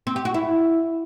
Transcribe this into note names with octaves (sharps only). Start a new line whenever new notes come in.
C4
G4
F#4
E4